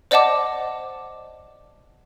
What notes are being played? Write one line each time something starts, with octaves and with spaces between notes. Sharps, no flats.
C5 D5 D#5 F#5 A5 D6